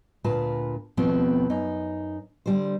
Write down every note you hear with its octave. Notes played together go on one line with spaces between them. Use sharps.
D2 A#2 F4 A#4 B4 A5
D#2 B2 F3 A3 B3 C4
F#2 D#4
D3 G3 C5